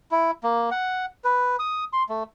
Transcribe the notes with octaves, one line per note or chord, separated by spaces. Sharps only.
E4
A#3
F#5
B4
D#6
C6
A3